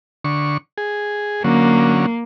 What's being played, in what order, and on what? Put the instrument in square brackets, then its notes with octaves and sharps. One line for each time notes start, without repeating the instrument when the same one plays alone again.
[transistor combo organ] D3 C#6
G#4
[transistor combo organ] D3 F#3 C#4 [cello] A#3